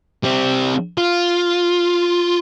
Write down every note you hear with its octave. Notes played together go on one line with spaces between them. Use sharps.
G3 C4
F4